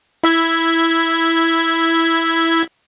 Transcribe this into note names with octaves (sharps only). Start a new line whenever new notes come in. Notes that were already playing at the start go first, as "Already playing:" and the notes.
E4 E5 G#6